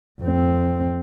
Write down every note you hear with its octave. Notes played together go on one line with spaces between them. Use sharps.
F2 C4